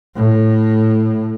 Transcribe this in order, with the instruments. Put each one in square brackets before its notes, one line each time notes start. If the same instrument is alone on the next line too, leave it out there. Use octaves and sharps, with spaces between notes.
[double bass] A2